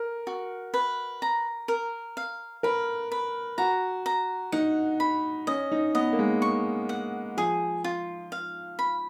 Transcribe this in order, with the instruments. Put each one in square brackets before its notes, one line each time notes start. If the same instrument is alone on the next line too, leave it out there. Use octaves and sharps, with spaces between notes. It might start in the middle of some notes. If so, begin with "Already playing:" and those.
Already playing: [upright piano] A#4
[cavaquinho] F#4
B4
A#5
A#4
F5
[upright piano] A#4 [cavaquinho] B4
[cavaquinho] B4
[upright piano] F#4 [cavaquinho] A#5
[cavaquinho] A#5
[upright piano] D#4 [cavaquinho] F#5
[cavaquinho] B5
[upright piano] C#4 [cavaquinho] D#5
[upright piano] D#4
[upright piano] B3 [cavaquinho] D#5
[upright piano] A#3
G#3
[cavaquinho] C#6
F#5
[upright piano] F3 [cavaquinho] G#4
[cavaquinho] F4
F5
B5